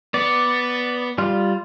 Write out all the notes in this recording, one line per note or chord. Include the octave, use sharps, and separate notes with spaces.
B3 D5
G3 F4